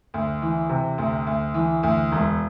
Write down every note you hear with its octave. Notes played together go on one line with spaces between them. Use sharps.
D2
E3
C3
D2
D2
E3
D2
E1